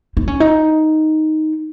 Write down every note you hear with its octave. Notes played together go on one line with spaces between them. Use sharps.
D#4
C#4
D#4